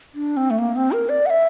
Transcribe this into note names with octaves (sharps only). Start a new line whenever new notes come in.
D4
C4
A3
A#3
C4
A#4
D5
F#5
E5